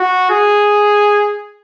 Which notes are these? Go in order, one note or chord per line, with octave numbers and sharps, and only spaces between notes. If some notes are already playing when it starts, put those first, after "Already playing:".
Already playing: F#4
G#4